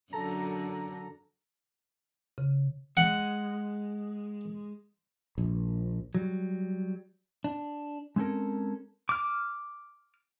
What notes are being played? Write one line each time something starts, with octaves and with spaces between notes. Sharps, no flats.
F#2 D3 A4 A#5
C#3
G#3 F#5
A#1
F#3 G3
D4
G#3 C4 C#4 A4 A#4
D6 F6